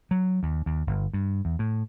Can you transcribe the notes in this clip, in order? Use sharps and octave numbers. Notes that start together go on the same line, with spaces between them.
F#3
D#2
D#2
G1
G2
E2
A2